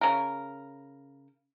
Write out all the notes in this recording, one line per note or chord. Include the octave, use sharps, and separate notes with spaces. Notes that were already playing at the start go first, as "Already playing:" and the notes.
C#3 A#4